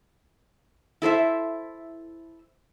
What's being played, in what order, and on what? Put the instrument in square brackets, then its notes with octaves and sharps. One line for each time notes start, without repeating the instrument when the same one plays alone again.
[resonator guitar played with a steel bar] E4 A4 C5 E5